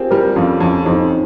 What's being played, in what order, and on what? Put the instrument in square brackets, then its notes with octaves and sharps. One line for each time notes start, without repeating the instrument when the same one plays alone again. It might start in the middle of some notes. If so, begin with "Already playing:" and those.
Already playing: [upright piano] C4 [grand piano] F4 G4 G#4 A#4
[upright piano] G3 [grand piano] G4 A#4
[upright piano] F2 [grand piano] C#4 F4
[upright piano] F2 [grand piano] C#4 F4
[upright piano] F2 [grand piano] C4 D#4